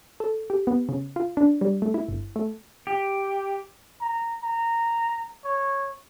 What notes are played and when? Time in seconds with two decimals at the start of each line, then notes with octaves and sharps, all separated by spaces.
0.20 A4
0.50 G4
0.67 B3
0.89 C#3
1.16 F4
1.37 D4
1.61 G3
1.82 A3
1.94 E4
2.09 G1
2.36 A3
2.87 G4
4.01 A#5
4.43 A#5
5.44 C#5